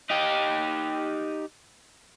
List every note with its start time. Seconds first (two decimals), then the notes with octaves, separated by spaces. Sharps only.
0.10 D#4 G4